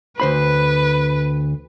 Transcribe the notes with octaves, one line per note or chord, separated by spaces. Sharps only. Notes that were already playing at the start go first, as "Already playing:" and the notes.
D2 B4 C5 B5